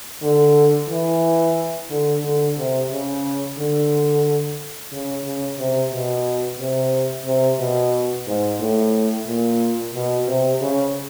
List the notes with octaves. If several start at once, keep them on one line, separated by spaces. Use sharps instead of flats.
D3
E3
D3
D3
C3
C#3
D3
C#3
C#3
C3
B2
C3
C3
B2
G#2
A2
A#2
B2
C3
C#3